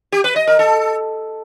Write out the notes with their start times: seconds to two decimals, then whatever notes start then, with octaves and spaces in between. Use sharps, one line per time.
0.12 G4
0.24 B4
0.36 D#5
0.47 A#4
0.59 A4